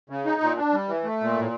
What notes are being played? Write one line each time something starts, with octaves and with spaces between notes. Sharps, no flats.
C#3
D#4
A#2
D4
G3
E3
A3
A#2
A2